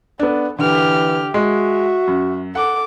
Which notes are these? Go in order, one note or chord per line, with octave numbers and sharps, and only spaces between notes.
B3 D4 A4
D3 E3 G4 F6
G#3 F#4 E5
F#2
A4 F#5 D6